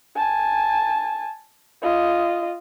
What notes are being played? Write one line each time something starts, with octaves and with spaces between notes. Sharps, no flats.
G#5 A5
F4 D#5